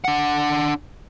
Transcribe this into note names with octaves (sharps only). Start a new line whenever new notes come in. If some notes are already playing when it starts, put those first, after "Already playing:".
D4 F#5